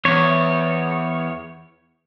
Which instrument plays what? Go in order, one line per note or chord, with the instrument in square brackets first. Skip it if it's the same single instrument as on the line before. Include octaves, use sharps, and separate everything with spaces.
[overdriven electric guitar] E2 [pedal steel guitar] C#5